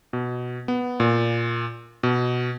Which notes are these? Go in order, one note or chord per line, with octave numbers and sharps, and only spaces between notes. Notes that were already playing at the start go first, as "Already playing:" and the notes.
B2
B3
A#2
B2